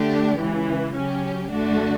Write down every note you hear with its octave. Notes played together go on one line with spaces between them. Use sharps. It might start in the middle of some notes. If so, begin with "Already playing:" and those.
Already playing: D3 A3 D4 G4
C#2 C#3 E3
C#3 F#3 C#4 G4
F#2 D3 A3 D4 F#4